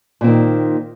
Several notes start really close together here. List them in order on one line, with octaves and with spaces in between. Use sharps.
A#2 C4 D#3